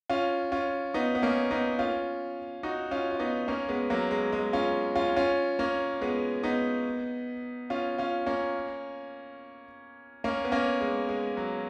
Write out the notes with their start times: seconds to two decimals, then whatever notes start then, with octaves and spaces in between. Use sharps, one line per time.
0.10 C#4 F4
0.52 C#4 F4
0.94 B3 D#4
1.15 B3
1.22 A#3 C#4
1.51 B3 D#4
1.79 C#4 F4
2.63 D#4 F#4
2.91 C#4 F4
3.11 F4
3.19 B3 D#4
3.48 A#3 C#4
3.69 G#3 B3
3.90 F#3 A#3
4.11 G#3
4.32 G#3
4.53 C#4 F4
4.96 C#4 F4
5.17 C#4 F4
5.59 A#3 C#4
6.01 G#3 B3
6.43 B3 D#4
7.70 C#4 F4
7.98 C#4 F4
8.26 A#3 C#4
10.24 A#3 C#4
10.44 B3
10.52 A#3 C#4
10.81 G#3
11.09 G#3
11.37 F#3